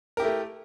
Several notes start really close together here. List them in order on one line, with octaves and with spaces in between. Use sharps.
A#4 G4 E4 A3